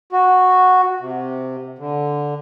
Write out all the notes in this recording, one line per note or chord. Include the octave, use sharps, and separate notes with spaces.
F#4
C3
D3